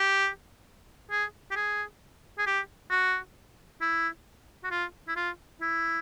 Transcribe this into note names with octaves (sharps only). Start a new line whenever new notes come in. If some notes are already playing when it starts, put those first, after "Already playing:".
Already playing: G4
G#4
G4
G#4
G#4
G4
F#4
E4
F#4
F4
E4
F4
E4